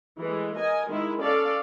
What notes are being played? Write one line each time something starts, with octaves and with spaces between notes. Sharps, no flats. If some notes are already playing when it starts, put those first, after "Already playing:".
E3 G#3 A3
A#4 D#5 G#5
D#3 G#3 E4
C#4 A4 D5 F5